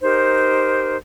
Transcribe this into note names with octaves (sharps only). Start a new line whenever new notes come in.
D#4 G4 A#4 C5